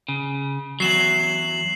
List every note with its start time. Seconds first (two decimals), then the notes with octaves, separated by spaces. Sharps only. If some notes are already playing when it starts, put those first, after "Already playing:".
0.09 C#3
0.80 E2 F#3 C7 E7 F#7